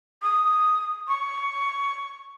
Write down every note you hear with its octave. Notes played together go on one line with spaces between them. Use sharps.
D#6
C#6